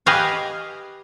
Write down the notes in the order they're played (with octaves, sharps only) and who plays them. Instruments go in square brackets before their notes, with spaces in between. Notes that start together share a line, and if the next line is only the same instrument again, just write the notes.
[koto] G4 B4 D#5 F5 G#5